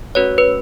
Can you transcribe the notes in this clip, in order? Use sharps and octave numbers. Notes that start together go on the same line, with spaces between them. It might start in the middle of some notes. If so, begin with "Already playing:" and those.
A3 C#4 F#4 B4 C#5
B4